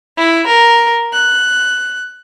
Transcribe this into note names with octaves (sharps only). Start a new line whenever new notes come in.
E4
A#4
F#6